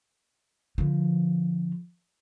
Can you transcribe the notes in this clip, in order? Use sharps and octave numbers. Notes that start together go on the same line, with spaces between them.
D3 F3